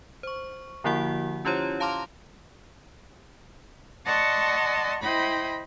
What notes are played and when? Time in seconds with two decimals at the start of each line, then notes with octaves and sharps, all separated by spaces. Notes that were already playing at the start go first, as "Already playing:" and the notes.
0.23 C5 C#6
0.84 D3 F3 A#3 E4 F#4 F#5
1.45 C#4 E4 F4 G4 C5 C#5
1.80 F5 A5 A#5 C6 D6 F6
4.06 D5 D#5 F#5 A5 C6 C#6
5.02 E4 C5 D#5 G5 B5